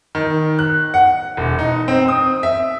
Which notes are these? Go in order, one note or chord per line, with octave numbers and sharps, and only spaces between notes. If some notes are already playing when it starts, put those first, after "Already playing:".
D#3
F#6
F#5
E1
D#4
C4
D#6
E5